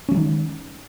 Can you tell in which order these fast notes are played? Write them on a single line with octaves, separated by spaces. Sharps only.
C#4 F#3 G#3 D#3